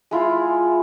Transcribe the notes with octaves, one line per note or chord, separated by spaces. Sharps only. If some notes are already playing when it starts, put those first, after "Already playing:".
G#3 E4 F4 G#4